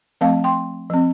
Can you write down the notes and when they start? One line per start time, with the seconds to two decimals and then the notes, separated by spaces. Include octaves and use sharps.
0.21 F3 A3 C4 F5 A5
0.44 G5 C6
0.90 F3 C4